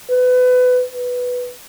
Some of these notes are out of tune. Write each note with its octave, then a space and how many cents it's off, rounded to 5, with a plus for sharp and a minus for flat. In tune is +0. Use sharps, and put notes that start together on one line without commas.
B4 +25
B4 +0